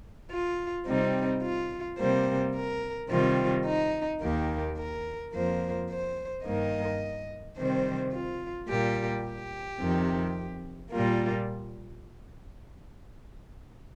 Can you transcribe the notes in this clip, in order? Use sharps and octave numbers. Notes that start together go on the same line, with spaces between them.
F4
C3 G3 C4 D#4
F4
C3 G3 A#3 C5
A#4
C3 D#3 G3 C4 F4
D#4
D#2 D#3 A#3 G4
A#4
F2 F3 A#3 C5
C5
G2 D#3 A#3 D#5
C3 D#3 G3 C4 C5
F4
A#2 G3 A#3 G4
G4
F2 C3 D#3
A#2 G3 A#3 F4